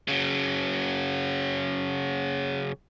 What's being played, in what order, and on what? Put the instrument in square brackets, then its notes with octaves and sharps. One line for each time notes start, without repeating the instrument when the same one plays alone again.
[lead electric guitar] C#3 F#3